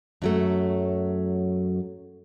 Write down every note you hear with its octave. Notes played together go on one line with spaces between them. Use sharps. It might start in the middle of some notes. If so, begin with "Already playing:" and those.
F#2 F#3 A3